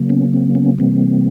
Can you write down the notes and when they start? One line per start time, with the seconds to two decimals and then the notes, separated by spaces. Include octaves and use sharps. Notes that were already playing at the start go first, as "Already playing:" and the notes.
Already playing: C#3 F#3 A#3
0.09 B3 C#4
0.33 C4
0.55 B3 C#4
0.78 C3 E3 G3 A#3 C4